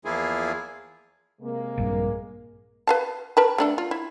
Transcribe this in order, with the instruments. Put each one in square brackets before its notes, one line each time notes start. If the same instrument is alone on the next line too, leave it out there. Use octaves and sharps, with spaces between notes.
[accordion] E2 F3 A#3 E4 F4 G#4
[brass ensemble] C3 G#3 A#3
[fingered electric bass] A#1 G2
[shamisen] B4 F5 A5
A#4 B4 A5
A3 D4 A4
F4
E4